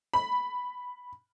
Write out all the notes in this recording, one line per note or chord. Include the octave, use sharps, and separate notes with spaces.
B5